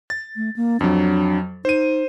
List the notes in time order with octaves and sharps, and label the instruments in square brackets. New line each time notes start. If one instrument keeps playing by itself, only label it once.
[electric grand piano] A6
[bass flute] A3
A#3
[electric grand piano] F2 F#3 [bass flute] D4
[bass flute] D#4 [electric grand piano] C5 D#7